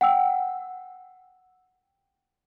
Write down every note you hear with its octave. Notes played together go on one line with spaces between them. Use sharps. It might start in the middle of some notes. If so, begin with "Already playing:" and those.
F#5 G5 E6